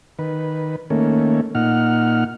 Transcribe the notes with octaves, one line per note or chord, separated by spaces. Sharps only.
D#3 B4
D#3 A3 A#3 C#4
A#2 D#4 F#5 F6